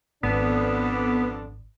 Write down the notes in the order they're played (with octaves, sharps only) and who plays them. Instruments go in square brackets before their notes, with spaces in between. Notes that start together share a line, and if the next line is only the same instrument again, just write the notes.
[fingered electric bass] G#1 [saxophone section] F2 D3 D4 [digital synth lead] B3